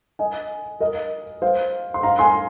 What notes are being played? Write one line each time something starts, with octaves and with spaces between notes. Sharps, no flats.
D#5 G#5
A#4 D#5
C5 F5
C6
F5 A#5
G#5 C6